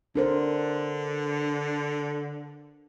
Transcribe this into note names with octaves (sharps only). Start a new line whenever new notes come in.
D3 D4 A#4 C5